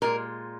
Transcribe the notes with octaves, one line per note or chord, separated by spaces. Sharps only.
A#2 G#3 A#4